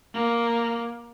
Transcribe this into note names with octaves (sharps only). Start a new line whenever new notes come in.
A#3